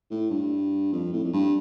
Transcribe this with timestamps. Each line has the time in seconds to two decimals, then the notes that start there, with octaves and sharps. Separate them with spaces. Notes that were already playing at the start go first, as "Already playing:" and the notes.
0.10 A2
0.30 G2
0.92 F2
1.13 A2
1.24 F2
1.33 G2